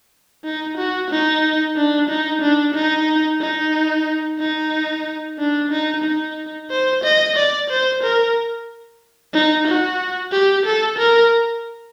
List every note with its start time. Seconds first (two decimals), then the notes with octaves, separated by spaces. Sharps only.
0.44 D#4
0.77 F#4
1.10 D#4
1.76 D4
2.09 D#4
2.41 D4
2.74 D#4
3.41 D#4
4.39 D#4
5.38 D4
5.71 D#4
6.04 D#4
6.70 C5
7.04 D#5
7.36 D5
7.70 C5
8.03 A#4
9.33 D#4
9.67 F#4
10.32 G4
10.65 A4
10.98 A#4